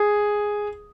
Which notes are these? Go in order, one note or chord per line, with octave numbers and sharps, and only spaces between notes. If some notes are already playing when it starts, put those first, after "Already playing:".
Already playing: G#4